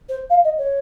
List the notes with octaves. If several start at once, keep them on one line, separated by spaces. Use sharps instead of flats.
C5
F5
D#5
C#5